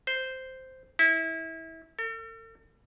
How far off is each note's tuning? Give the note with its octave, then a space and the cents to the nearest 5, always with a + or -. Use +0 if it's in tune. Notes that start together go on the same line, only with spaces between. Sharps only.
C5 -5
E4 -25
A4 +45